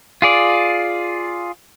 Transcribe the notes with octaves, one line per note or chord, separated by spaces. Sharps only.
F4 G#4 D5